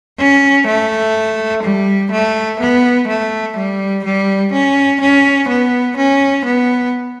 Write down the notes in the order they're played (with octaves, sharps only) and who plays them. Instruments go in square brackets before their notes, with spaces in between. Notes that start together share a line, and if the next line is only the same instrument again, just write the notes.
[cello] C#4
A3
G3
A3
B3
A3
G3
G3
C#4
C#4
B3
C#4
B3